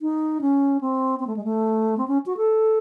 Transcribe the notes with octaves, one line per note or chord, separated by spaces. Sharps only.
D#4
C#4
C4
C4
A3
G#3
A3
C4
C#4
F#4
A4